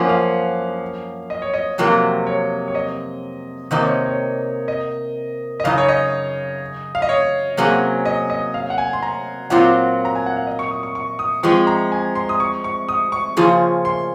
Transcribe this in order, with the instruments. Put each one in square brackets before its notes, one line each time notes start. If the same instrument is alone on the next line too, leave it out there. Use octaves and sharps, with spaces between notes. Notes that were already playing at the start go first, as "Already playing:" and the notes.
Already playing: [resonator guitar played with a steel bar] F#2 F3 A#3 C#4 [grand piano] F#5
[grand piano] F5
D#5
C#5
D#5
[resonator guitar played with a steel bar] F2 C3 F#3 A#3
[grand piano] C#5
C#5
D#5
[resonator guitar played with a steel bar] C3 D#3 A#3 D#4 [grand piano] D#5
[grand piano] C#5
C#5
D#5
D#5
[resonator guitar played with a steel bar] F#2 C#3 D#4 [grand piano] F5
[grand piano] C#5
D#5
F5
D#5
C#5
[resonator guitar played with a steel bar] C3 F#3 A#3 C#4 G#4
[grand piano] D#5
D#5
F5
F#5
G#5
C6
A#5
[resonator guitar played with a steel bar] A#2 F#3 C4 F4 [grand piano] F#5
[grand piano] A#5
G#5
F#5
F5
D#5
C#6
D#6
C#6
C#6
D#6
[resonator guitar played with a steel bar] F3 G#3 C4 [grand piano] C#6
[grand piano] A#5
G#5
C6
D#6
C#6
C#6
D#6
C#6
[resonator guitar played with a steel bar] C#3 F3 A#3 F4 G#4
[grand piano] C6